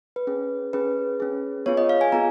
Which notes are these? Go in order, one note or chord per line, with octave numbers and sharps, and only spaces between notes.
B4
C#4 G#4
C#4 G#4 B4
C#4 G#4
B3 F4 G#4 C#5
D#5
F5
G#5
B3 F4 G#4 A#5